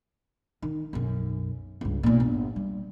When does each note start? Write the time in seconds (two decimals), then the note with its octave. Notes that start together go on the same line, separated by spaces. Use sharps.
0.62 D#3
0.93 B1 F#2
1.81 C#2 G2
2.03 B1 A#2
2.20 G1
2.56 G3